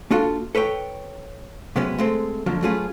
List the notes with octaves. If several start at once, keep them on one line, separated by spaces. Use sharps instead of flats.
A#3 D4 F4 F#4 A4
A4 B4 C#5 G5
C3 F#3 G#3 B3 C#4
G#3 A3 C4
F2 D3 F3 F#3 A#3
F#3 A3 C#4 F4 G#4 B4